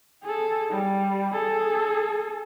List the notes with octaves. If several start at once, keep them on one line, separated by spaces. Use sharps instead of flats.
G#4 A4
G3
G#4 A4